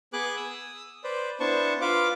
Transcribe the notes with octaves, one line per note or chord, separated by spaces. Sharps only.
B3 G#4 B4 G#5 D6 F#6
D#6 E6
B4 C5 D5
B3 D4 E4 C5 A5 C#6
F4 B4 F5 D6